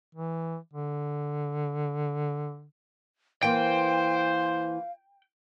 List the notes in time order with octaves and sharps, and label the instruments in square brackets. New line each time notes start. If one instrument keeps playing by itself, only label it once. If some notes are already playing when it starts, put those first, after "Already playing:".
[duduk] E3
D3
[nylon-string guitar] E3 A#3 [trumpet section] C5 [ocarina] F5 [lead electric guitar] G5